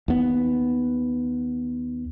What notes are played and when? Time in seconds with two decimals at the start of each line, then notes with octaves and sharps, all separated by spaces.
0.08 D#2 B3